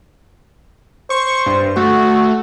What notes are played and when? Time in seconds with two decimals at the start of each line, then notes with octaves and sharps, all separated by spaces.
1.10 C5 C#6
1.46 G2
1.77 A3 F#4